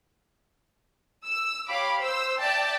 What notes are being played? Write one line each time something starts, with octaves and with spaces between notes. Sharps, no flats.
E6
G4 C#5 F5 B5 D6
C5 E6
D5 E5 G5 A5